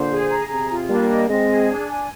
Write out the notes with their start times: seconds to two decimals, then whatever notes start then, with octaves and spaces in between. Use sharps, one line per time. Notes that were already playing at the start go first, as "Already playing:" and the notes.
Already playing: A#2 D3 C5
0.10 G#4
0.30 A#5
0.49 C3 G#4
0.69 F4
0.89 G3 A#3 D4
1.09 D#5
1.28 G#3 C4 D#5
1.48 G#4
1.68 D4
1.87 G#5